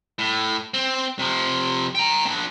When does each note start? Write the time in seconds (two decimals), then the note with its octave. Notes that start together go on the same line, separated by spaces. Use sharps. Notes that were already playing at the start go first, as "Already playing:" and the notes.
0.19 A2
0.74 C4
1.19 C3 F3
1.95 G5 A#5
2.25 A#3 D4